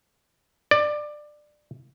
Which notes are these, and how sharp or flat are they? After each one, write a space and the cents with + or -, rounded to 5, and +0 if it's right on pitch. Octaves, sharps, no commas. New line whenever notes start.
D5 +20